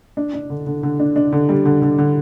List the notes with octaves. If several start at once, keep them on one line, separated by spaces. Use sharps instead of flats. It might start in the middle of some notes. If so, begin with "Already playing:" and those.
D4
D4
D3
D3
D3
D4
D4
D3
G3
D3
D3
D3